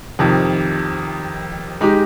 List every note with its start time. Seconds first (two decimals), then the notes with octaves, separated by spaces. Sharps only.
0.19 F2 C3 D#3
1.81 G#3 D#4 G4